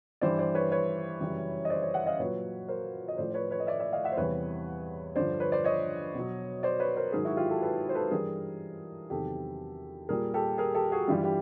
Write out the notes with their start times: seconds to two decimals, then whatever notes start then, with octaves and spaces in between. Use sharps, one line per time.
0.21 G2 E3 G3 C5 D5
0.39 C5 D5
0.55 B4 C#5
0.72 B4 C#5
1.20 F#2 C#3 E3 G3
1.65 D#5
1.70 C5 D5
1.82 B4 C#5
1.94 E5 F#5
2.06 D#5 F5
2.19 A#2 F#3 B4 C#5
2.68 A#4 C5
3.08 D#5
3.18 A2 F3 C5 D5
3.30 C5
3.34 B4 C#5
3.51 B4 C#5
3.60 D#5
3.67 D5 E5
3.80 D5 E5
3.93 D#5 F5
4.04 E5 F#5
4.12 C5
4.17 E2 C3 E3 G3 B4 C#5
5.16 G2 D3 F3 C5 D5
5.40 B4 C#5
5.52 C5 D5
5.64 C#5 D#5
6.14 B2 F#3
6.63 C5 D5
6.80 B4 C#5
6.96 A#4 C5
7.12 G#2 D#3 F#3 G#4 A#4
7.25 E4 F#4
7.37 F4 G4
7.49 G4 A4
7.62 A4 B4
7.89 C5
7.95 A4 B4
8.11 G2 E3 G3 G#4 A#4
9.10 E2 C3 D#3 F#3 G4 A4
10.09 A#2 G3 G#4 A#4
10.34 G4 A4
10.58 G#4 A#4
10.75 G4 A4
10.92 F#4 G#4
11.08 G2 E3 G3 F4 G4
11.24 G4